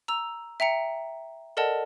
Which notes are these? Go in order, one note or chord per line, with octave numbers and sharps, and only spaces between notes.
A#5 E6 F7
E5 G5 A#5 C#7
A4 A#4 D5 D#5 F#5 A5